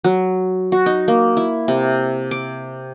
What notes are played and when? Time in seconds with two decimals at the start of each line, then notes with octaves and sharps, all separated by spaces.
0.04 F#3
0.72 F#4
0.86 D#4
1.08 A#3
1.37 E4
1.68 C3
2.31 D6